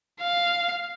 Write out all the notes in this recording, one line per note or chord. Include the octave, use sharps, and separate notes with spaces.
F5